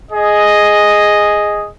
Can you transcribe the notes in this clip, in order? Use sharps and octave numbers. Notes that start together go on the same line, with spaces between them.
G#4 D#5